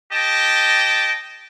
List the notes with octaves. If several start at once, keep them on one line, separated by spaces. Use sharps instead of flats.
G4 D#5 G5 A5